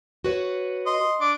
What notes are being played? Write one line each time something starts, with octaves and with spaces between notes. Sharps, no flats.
F#4 B4 C#5
D#5 C6
D4 D6